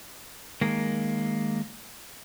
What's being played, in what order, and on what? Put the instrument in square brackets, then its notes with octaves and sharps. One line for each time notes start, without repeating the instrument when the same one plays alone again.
[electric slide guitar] D#3 G#3 A#3